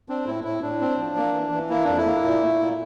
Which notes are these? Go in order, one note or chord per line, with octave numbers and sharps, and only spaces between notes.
C4 D4
A2 E4
A2 E4
A2 D4
C4
F3
A#3
E3
E3
A#3 E4
F2 D4
E4
A#3
A#2
A3
A#2